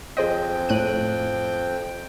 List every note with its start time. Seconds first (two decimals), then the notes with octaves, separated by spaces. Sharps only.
0.17 F2 G#4 C5 D#5 G5
0.69 A2 F#6 D#7